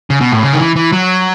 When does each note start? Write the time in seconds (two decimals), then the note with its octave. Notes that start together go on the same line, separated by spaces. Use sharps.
0.10 C#3
0.21 B2
0.32 A2
0.43 C#3
0.52 D#3
0.60 E3
0.76 E3
0.92 F#3